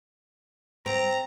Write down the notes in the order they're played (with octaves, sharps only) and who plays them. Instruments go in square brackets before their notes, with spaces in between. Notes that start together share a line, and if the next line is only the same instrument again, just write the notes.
[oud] C4 [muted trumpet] A#5